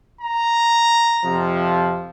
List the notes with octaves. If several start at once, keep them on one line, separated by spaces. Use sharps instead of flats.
A#5
F2 C3 F3